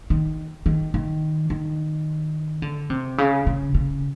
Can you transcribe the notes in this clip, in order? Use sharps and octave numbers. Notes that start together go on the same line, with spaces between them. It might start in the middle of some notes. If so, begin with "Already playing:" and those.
D#3
D#3
D#3
D#3
D3
C3
C#3
C#3
C#3